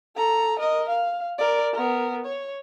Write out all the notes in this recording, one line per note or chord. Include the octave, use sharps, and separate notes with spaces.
A4 A#5
A#4 D#5
F5
A#4 D5
B3 A#4
C#5